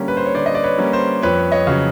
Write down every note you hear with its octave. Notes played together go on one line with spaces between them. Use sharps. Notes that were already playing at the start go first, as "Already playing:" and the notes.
Already playing: D3 G3 A#3 C#4
B4
C5
C#5
D3 C5 D5
D#5
D5
B4 C#5
G3 A#3 C#4
C5
F2 B4 C#5
C#5 D#5
C#3 F#3